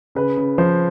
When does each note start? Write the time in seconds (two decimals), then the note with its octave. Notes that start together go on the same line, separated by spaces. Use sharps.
0.15 C#3 B4
0.37 C#3
0.58 F3 C5